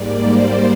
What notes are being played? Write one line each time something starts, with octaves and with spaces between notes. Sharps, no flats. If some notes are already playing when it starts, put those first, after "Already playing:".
Already playing: G#2 G3 A#3 D5
C5